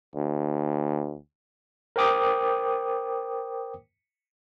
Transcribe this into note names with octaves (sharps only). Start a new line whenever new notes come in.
D2
A#4 C5 G5 D6 D#6